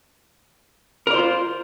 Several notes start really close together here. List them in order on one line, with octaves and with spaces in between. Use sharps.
A#4 D5 C5 F4